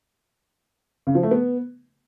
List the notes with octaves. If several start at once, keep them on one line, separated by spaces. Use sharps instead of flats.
C#3
F3
A3
B3